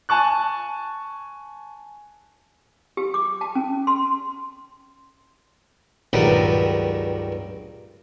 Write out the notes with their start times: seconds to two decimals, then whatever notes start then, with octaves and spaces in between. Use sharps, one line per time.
0.09 G#5 A5 C#6 F#6
2.97 G4
3.14 D6
3.41 A5
3.55 C#4
3.87 C6
6.13 C#2 G2 D#3 F#3 D#4 B4